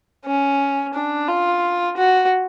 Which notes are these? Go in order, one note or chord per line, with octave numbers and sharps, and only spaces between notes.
C#4
D4
F4
F#4